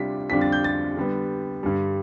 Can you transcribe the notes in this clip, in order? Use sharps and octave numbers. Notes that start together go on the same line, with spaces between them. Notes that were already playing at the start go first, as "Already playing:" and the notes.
Already playing: C3 G3 D4 F4 B6
F2 D3 G3 D4 F4 B6
A6
G6
A6
D3 G3 B3
G2 D3 G3